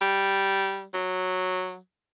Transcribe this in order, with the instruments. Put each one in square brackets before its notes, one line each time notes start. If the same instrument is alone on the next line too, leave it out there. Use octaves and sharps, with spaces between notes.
[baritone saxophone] G3
F#3